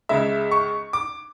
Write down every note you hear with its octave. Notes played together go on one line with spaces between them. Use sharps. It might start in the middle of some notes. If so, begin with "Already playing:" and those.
C#2 C#3 G#3 E5
C#6
D6